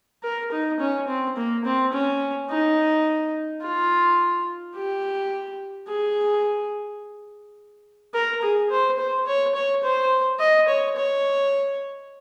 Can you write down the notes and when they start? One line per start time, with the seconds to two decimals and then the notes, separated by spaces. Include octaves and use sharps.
0.23 A#4
0.52 D#4
0.80 C#4
1.08 C4
1.37 A#3
1.65 C4
1.93 C#4
2.50 D#4
3.62 F4
4.75 G4
5.88 G#4
8.14 A#4
8.42 G#4
8.70 C5
8.99 C5
9.27 C#5
9.55 C#5
9.83 C5
10.40 D#5
10.68 C#5
10.96 C#5